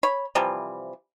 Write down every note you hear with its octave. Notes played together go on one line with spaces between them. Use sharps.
C#5 B5
C3 E3 F3 G3